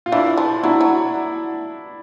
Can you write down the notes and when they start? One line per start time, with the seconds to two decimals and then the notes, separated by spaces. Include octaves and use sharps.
0.06 F4
0.12 E3 D4 E4
0.37 F3
0.63 F#3 D4 E4
0.81 F#3